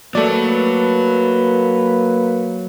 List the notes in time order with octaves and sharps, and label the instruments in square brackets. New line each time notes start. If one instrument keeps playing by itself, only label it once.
[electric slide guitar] F#3 [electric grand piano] A3 D5 [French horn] A#3 [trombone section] B4